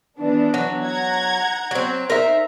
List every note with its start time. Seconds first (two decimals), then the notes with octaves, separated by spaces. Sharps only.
0.19 E3 B3 D4
0.54 F#3
0.86 F#5 A#5 G#6
1.71 F#3 C4
2.10 D#4 A#4 C5 E5